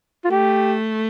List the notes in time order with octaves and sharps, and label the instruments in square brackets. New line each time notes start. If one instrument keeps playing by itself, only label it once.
[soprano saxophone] F4
[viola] A3 [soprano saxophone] G4